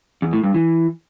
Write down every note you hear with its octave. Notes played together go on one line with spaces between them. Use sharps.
E2
A2
G2
E3